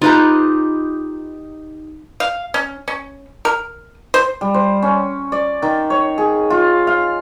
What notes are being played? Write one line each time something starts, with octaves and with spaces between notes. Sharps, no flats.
D#4 F4 G4 B4 A#5
F5
C#4
C#4
A#4
C5
G3
C5
C#4
D5
D#3
C#5
G#4
F4
F5